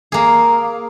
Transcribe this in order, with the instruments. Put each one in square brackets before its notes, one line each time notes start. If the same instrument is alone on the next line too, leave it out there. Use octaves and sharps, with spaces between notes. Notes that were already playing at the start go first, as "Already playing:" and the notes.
[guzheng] A#3 G#4